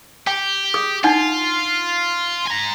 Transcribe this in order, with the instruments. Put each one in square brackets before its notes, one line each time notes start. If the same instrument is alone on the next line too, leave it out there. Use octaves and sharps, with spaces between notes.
[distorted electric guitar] G4 [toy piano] G5
[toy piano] G#4 D#6
[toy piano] D4 D#4 F#5 [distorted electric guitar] F4
[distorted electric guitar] G#5 A#5